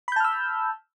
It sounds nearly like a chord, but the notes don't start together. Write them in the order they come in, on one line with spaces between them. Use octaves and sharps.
B5 G6 A5 F6 E6